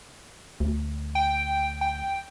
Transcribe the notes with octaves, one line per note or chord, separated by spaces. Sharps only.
D2
G5
G5